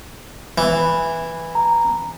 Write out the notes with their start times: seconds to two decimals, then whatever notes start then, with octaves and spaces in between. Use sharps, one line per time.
0.58 E3
1.55 A#5